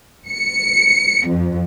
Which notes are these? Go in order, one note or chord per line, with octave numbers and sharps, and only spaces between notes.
C#7
F2